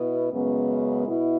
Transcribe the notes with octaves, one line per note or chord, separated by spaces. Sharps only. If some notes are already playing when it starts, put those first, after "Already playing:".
Already playing: B2 B3 E4
F#2 C#3 G#3 B3
B2 B3 E4